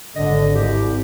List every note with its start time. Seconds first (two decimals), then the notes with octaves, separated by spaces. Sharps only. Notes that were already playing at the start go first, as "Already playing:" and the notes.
0.16 G#1 D3 D#5
0.55 C2 G4